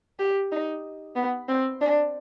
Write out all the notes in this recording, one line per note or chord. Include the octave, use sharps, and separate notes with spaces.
G4
D#4
B3
C4
D4